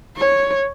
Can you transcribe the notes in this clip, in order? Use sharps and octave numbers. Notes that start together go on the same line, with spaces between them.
C#5